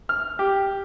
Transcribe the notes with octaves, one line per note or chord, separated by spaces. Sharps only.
F6
G4